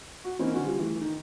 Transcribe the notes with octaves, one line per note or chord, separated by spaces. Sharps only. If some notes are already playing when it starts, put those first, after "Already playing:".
F#4
E3 A#3 C4 C#4 D#4 E4
D3 C#4 F#4
G3 F4
E3 A3
D#3